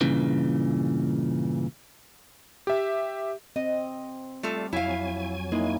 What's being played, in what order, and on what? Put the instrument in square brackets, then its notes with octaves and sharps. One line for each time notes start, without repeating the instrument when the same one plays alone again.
[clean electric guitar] G2 A#2 C#3 E3
[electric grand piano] G4 E5
[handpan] C4 [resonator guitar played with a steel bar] D#5
[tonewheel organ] G3 [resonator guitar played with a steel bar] A3 F4 A4
[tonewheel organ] F2 F#3 G#5 [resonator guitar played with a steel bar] E4 F5
[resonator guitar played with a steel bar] G#3 [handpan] A#3 D#4 E4